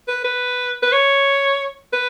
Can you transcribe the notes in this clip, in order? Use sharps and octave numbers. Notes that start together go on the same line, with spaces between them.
B4
B4
B4
C#5
B4